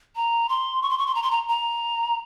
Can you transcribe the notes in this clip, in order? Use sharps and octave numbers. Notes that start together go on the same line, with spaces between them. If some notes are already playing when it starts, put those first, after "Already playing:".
A#5
C6
C#6
C6
C#6
C6
A#5
C6
A#5
A#5